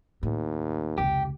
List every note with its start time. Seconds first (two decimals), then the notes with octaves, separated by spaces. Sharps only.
0.23 D#2 A2
0.98 F1 C#2 G4